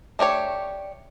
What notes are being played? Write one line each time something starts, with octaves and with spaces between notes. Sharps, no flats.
A3 D4 G4 C#5